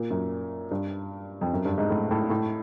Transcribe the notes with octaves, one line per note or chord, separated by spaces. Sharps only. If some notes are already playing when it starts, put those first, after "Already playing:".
Already playing: A#2
F#2
G2
F2
F#2
G2
G#2
A2
A2
A2